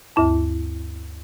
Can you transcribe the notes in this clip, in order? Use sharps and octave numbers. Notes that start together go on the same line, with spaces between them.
D2 G2 E4 A5